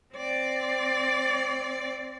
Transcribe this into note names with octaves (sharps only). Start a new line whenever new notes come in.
C4 D5